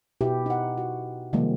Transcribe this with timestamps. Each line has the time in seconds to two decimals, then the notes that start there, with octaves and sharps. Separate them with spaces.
0.21 B2 E4 G4 B4 E5
0.46 D#4 F#5
0.78 F#4
1.33 C3 D#3 F3 G3 G#3 A#3